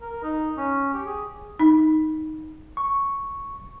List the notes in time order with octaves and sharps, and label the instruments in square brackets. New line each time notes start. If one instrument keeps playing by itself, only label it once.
[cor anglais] A#4
D#4
C#4
G4
G#4
[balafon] D#4
[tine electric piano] C#6